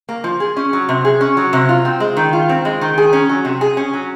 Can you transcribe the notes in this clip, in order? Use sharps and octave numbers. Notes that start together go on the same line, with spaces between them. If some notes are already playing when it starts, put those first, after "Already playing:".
A#3
F3
G#4
C#4
F#3
C3
G#4
C#4
F#3
C3
F4
C4
G#3
D#3
F4
C4
G#3
D#3
G#4
C#4
F#3
C3
G#4
C#4
F#3